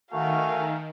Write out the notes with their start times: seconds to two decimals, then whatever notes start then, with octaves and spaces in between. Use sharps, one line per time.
0.12 D#3 A3 F#4 A#4 F5 G#5